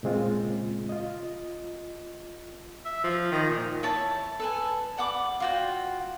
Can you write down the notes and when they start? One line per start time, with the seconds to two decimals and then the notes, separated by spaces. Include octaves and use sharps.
0.03 A#2 C#3 G#3 C4 F4
0.89 F4 D#5
2.85 E5
3.03 F3
3.31 D#3
3.50 A#2
3.83 E4 C#5 A5
4.40 A4 B4 G#5
4.98 D5 F#5 B5 D6
5.40 F4 F#4 G5